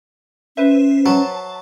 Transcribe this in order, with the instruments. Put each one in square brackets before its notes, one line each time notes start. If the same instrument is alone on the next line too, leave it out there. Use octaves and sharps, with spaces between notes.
[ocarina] C#4 [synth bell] B4 C5 E5
[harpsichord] F#3 [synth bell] A5